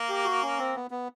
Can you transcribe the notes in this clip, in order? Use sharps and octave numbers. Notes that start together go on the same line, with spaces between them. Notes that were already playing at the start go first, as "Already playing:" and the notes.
Already playing: A#3
G4
F#4
C#4
C4
B3
B3